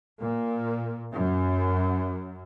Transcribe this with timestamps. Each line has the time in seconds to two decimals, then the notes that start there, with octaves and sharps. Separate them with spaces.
0.19 A#2
1.14 F#2